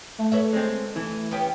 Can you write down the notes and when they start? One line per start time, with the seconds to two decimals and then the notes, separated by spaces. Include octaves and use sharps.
0.18 A3
0.32 B4 C#5 E5
0.53 G#3 C4
0.96 E3
1.31 B3 C#4 G4